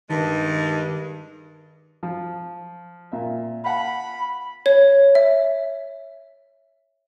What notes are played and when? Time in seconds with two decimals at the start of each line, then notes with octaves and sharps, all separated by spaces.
0.09 G2 D#3 G#3
2.03 F3
3.12 A#2 E5
3.64 F5 F#5 A5 B5
4.66 C#5
5.15 E5